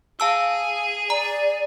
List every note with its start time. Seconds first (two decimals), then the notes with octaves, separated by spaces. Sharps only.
0.20 G#4 F5 A5 E6
1.10 D5 A#5